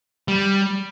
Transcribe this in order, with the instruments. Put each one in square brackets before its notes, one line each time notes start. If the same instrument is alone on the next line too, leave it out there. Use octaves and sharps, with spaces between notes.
[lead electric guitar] G3